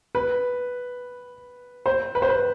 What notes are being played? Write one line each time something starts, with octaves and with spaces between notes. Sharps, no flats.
B4
C5
B4
C5
B4